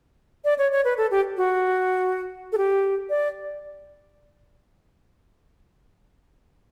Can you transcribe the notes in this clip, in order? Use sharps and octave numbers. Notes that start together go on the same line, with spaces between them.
D5
C#5
C#5
B4
A4
G4
F#4
A4
G4
D5